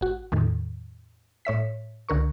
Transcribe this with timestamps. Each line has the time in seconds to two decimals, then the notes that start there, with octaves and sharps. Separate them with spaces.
0.01 G#1 F#4
0.32 E2 A2 D#3
1.45 A2 C#5 E5 B6
2.09 C#2 D3 A#4 C#6